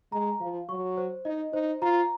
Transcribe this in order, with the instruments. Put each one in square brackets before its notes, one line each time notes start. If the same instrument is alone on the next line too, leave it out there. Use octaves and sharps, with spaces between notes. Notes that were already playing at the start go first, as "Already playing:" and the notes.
[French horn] G#3 [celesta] A#5
[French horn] F3 [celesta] F5
[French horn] F#3 [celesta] C#6
[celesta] C5
[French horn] D#4 [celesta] D#5
[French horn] D#4 [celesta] C5
[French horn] F4 [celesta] A#5